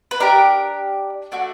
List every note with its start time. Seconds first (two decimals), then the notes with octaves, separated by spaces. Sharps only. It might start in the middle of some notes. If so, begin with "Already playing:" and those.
0.11 B4
0.20 D4 G4 A#4
1.32 A3 D4 F#4 A4